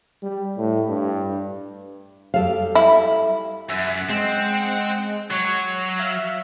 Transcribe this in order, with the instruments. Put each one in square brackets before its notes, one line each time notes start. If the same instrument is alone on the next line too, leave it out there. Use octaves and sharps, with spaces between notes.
[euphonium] G3
A2
G2
[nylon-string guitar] G3 A4 F5
[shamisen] E4
[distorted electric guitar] F#2 [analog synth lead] E5 [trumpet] F#5
[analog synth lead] G#3 [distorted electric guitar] C4
[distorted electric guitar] F#3 [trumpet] C#5 [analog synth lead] C7
[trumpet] E5 [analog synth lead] F5